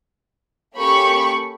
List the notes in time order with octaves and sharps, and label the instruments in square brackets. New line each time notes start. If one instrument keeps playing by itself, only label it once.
[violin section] A#3 C#4 G4 A4 B5 C#6